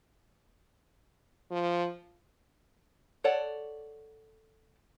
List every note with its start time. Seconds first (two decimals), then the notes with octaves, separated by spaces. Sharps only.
1.51 F3
3.24 A4 C#5 D5 F#5 A5